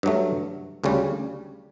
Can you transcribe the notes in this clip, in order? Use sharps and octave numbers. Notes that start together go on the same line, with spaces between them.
G2 F#3 A3
D2 C#3 G3 C#4